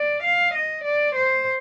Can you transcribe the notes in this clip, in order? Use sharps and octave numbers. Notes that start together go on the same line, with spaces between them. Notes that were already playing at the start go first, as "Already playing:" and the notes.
Already playing: D5
F5
D#5
D5
C5